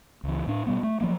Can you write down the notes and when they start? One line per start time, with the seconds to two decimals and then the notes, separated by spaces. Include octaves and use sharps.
0.24 C#2 E3
0.47 A2 D4
0.67 B2 G3 B3
0.83 A3
1.01 F3 F#3 A#3